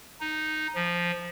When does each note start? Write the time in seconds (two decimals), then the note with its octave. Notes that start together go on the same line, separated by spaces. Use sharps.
0.20 D#4
0.75 F3